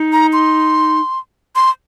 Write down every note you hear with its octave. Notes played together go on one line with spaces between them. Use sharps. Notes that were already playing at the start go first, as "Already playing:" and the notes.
Already playing: D#4
A#5
C6
C6